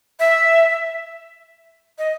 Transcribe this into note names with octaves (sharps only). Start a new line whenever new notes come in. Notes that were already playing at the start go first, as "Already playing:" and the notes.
E5
D#5